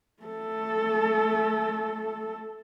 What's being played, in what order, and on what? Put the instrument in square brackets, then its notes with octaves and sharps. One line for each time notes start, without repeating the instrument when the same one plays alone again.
[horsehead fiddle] A3 A4